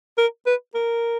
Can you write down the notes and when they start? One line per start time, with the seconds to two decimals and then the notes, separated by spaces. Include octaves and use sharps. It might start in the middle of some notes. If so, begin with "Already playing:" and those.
0.18 A#4
0.46 B4
0.75 A#4